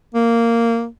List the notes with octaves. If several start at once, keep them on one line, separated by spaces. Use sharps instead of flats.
A#3